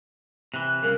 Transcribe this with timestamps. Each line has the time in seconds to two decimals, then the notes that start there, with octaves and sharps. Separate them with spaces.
0.54 C3 E3 F#6
0.83 C2 C#3 A#4